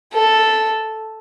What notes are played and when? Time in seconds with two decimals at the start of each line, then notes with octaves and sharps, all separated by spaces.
0.13 A4